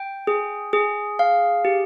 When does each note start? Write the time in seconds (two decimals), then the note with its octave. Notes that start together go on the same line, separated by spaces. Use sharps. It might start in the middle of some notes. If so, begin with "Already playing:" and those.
Already playing: G5
0.27 G#4
0.73 G#4
1.19 F5
1.65 G4